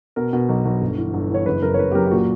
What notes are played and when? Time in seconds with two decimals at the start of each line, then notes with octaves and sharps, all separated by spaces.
0.16 B2 A#4
0.33 B2
0.49 B1
0.65 B1
0.81 G1
0.98 E3
1.14 G1
1.30 E3 C#5
1.46 F#1 B4
1.62 F#1 A#4
1.74 C#5
1.79 F#1 B4
1.91 G4
1.95 F#2 A#4
2.07 G4
2.11 A#2 F#4